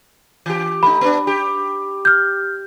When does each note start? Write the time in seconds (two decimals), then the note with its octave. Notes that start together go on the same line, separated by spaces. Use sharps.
0.46 E3 G4
0.83 A3 D#4 B5
1.01 B3 D4
1.27 G4
2.05 F6 G6